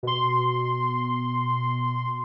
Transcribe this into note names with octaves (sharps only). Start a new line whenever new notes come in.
B2 C6